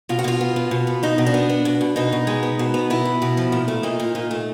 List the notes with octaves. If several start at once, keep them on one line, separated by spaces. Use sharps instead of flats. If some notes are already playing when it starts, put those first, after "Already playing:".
B2 F4
F#4
B2 F4
B3
B2
B2
B3
B2 D#4
B2
D4
B3
B3
B2
B2
B2 D#4
B2
G#3
B3
B2
B3
B2 E4
B2
B2
F3
A#2
A3
A#2 D#4
A#2
A#2
A3